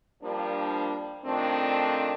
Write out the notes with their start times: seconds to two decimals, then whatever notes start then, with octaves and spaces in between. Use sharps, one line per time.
0.23 F3 G3 A#3 D4
1.26 F2 D#3 A3 C4 D4